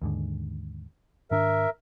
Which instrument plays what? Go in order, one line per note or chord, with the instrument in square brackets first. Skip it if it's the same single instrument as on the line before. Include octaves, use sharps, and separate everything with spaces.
[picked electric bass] D#2 G#2 D3
[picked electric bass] G#2 D#3 D4 [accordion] A#4 E5